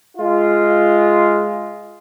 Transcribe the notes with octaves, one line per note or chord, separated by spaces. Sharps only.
G#3 F4